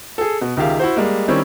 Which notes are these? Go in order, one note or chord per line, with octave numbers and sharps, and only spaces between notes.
G#4 A4
B2
C#2 D#3 G4 G#4 E5 F5
E4 F#4 C5
G3 G#3 A#3
D#3 G3 C4 C#4 E4